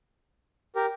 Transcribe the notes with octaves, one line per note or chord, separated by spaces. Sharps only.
G4 A#4